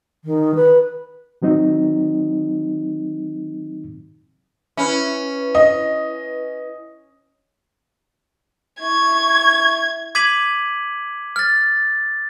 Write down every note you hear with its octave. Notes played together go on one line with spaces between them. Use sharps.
D#3
B4
D#3 F#3 C4 D#4
C#4 E4 B4
D#5
E4 C#6 G#6
D6 G#6 B6 D#7 F#7
F6 A6